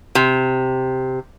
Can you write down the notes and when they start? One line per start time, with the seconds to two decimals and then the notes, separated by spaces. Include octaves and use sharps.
0.15 C3